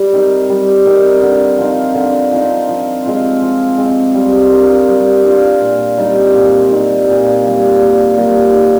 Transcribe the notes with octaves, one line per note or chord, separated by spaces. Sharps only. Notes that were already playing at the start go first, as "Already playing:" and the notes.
Already playing: G3
C4 D#4 A#4
G3
C4 D#4 A#4
D3
F3 C4 D#4
D3
F3 C4 D#4
F3
G#3 C4 F4
F3
G#3 C4 F4
G3
D4 F4 A#4
G3
D4 F4 A#4
A#2
G3 C4 D#4
A#2
G3 C4 D#4
A#2
G3 A#3
A#2
G3 A#3
D#3